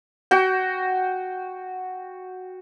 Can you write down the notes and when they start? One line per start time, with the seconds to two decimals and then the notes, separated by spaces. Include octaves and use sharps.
0.31 F#4 G5